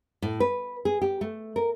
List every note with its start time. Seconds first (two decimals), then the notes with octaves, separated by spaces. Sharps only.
0.22 A2
0.40 B4
0.85 G#4
1.02 G4
1.21 A3
1.56 A#4